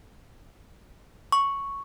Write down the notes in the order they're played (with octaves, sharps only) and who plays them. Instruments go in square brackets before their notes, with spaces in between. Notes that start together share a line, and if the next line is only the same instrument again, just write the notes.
[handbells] C#6